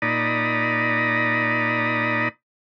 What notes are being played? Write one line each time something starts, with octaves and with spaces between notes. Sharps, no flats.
A#2 D#4 D5 A#5 B5 D#6